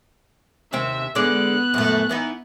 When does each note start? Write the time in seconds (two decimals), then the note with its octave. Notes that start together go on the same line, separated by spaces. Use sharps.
0.73 D#2 C3 C4 E5
1.15 D3 G#3 B3 D5 F#6
1.74 F#2 A#2 A3
2.09 E3 B3 D#4